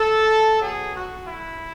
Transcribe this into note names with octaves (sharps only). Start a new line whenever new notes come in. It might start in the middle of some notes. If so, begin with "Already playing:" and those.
Already playing: A4
B2 F#3 G#4
F#4
E4